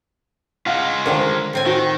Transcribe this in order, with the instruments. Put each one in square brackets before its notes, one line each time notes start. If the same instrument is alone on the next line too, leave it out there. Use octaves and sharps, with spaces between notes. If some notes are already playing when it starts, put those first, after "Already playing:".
[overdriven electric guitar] G#3 F4 [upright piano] F5 F#5
[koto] D3 D#3 F3 [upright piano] A#4
[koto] A2 C4 G#5
[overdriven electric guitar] D#3 [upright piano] F#4